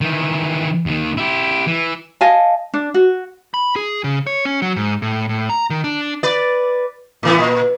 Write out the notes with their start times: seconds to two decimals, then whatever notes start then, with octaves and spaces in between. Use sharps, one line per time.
0.01 D#3 E3
0.86 D#2 D#3
1.17 E4 G4
1.67 E3
2.21 D#5 F5 G#5 A5
2.74 D4
2.94 F#4
3.54 B5
3.76 G#4
4.04 C#3
4.27 C#5
4.45 C#4
4.62 F#3
4.76 G#2
5.02 A2
5.29 A2
5.50 A#5
5.70 D#3
5.84 D4
6.23 B4 D5
7.23 A2 E3 B3
7.39 A#2